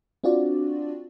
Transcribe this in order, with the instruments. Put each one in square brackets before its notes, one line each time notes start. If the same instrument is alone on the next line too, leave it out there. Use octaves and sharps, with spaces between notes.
[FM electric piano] C4 D4 F4 F#4 D5